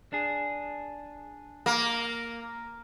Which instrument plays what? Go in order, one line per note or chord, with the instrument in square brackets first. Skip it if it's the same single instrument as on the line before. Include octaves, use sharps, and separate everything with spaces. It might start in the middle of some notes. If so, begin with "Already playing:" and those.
[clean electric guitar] D4 G#4
[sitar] A#3